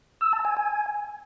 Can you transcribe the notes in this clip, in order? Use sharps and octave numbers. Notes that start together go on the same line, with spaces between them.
E6
A5
G#5
G#5